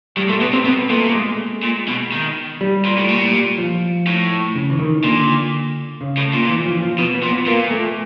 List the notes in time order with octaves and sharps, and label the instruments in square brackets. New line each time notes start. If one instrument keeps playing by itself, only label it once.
[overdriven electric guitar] A2 [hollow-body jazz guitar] G3
[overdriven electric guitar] A#2 [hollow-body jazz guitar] A3
[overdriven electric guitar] B2 [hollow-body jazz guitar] B3
[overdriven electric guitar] C3 [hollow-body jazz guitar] C4
[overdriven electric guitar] B2 [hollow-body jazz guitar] B3
[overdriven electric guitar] A#2 [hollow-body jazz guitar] A3
[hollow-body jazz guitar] G#3
[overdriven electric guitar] A#2
B2
D#3
[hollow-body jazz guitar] G3
[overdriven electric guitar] A#2
A2
A#2
[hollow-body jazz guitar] F3
[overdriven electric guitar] A2
[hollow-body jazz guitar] C#3
E3
D#3
[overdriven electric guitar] A#2 [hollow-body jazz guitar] D3
[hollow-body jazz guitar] C#3
[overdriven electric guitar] A2
A#2
[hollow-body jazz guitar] E3
F3
F3
[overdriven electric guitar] B2 [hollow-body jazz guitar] B3
[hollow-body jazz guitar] B3
[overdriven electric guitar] A#2
[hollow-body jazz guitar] B3
[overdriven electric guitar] A#2 [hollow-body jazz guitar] A#3
[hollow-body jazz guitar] A3